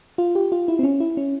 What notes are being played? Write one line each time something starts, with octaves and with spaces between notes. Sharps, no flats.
F4
G4
F4
E4
C4
C#4
E4
C#4